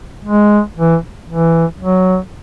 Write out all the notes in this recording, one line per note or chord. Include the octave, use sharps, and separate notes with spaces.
G#3
E3
E3
F#3